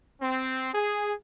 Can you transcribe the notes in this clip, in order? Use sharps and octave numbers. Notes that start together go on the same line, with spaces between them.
C4
G#4